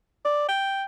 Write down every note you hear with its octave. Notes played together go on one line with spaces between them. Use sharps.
D5
G5